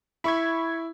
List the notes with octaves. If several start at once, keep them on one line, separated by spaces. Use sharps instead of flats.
E4 B5 C#6 G#6